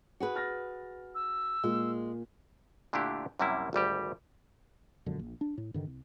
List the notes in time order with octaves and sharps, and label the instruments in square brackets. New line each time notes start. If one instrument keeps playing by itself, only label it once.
[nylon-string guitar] F#4 G#4 B4
[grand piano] F6 A6 A#6
[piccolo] E6
[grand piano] A#2 [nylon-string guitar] G#3
[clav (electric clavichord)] A#2 D3 A3 D4 E4 G4
F#2 C3 G3 A#3 E4
G#1 D2 G3 G4
[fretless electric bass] E1 A#1 F#2 D3
A#1
D4
A2
G2 D3 D#3
C2